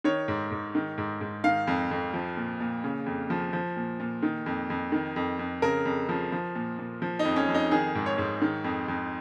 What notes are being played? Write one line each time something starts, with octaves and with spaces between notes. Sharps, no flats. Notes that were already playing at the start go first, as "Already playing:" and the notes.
D#3 C#5
G#2
G#2
D#3
G#2
G#2
D#3 F5
F2
F2
F3
A#2
A#2
C#3
F2
F3
F3
A#2
A#2
D#3
F2
F2
D#3
F2
F2
C#3 A#4
F2
F3
F3
A#2
A#2
F3
D#4
F2
C#4
F2
D#4
D#3 G#4
G#2
C#5
G#2
D#3
F2
F2